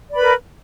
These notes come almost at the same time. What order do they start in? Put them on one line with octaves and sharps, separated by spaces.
D5 B5 B4 A#4